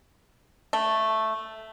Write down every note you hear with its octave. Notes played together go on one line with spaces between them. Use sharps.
A3